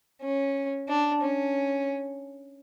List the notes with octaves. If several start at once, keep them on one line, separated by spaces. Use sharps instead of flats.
C#4
D4
C#4